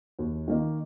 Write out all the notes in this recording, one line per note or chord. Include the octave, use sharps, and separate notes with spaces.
D#2
D#3 A#3 D#4